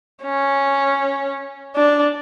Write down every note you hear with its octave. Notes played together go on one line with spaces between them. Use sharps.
C#4
D4